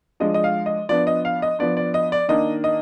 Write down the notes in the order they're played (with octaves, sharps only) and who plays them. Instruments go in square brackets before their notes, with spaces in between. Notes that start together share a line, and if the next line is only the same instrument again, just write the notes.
[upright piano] F3 G#3 D4 D#5
D#5
F5
D#5
F3 B3 D4 D5
D#5
F5
D#5
F3 B3 D4 D5
D5
D#5
D5
D#3 A#3 D4 D#5
D#5